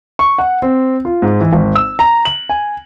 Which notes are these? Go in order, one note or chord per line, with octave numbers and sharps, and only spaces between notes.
C#6
F#5
C4
F4
G#2
E3
G#1
E6
A#5
F#7
G#5